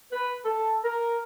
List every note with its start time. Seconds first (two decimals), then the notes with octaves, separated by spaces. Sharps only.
0.12 B4
0.45 A4
0.84 A#4